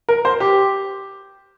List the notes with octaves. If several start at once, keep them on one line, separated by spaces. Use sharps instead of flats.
A#4
C5
G4